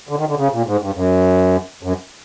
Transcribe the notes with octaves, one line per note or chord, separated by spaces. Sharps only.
D3
D#3
D3
C#3
A#2
G#2
G2
F#2
F#2